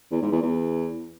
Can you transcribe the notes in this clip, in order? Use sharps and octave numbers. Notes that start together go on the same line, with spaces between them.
E2
G#2
E2
E2